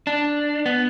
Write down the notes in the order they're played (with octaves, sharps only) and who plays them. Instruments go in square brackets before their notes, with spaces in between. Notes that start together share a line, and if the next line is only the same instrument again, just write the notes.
[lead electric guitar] D4
B3